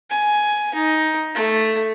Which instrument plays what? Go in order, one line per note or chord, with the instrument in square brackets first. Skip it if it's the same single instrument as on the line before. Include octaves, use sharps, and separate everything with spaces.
[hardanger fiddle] G#5
D#4
A3